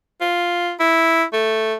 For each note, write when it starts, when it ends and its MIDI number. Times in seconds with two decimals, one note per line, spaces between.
0.21 0.72 65
0.80 1.24 64
1.33 1.75 57